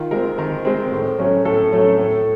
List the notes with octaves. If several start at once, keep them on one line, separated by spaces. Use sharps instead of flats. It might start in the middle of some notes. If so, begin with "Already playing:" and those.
Already playing: D#3 F4
G#3 C4 A#4
D#3 A#4
G#3 C4
A2
F#3 A3 C#4
A2 A4
F#3 A3 C#4
A2